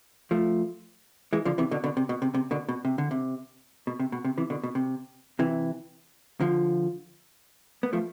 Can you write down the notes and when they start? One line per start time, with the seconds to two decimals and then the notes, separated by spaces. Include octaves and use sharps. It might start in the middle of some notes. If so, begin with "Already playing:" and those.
0.31 F3 A3
1.33 E3 G#3
1.45 D3 F3
1.58 C3 E3
1.71 B2 D3
1.84 B2 D3
1.97 C3
2.09 B2
2.22 C3
2.34 C3
2.51 B2 D3
2.69 B2
2.85 C3
2.98 D3
3.11 C3
3.87 B2
4.00 C3
4.12 B2
4.25 C3
4.38 C3 E3
4.50 B2 D3
4.64 B2
4.75 C3
5.39 C3 E3
6.40 D3 F3
7.83 B3
7.93 F3 A3